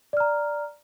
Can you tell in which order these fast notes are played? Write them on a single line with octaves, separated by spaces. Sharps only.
D5 F6 A#5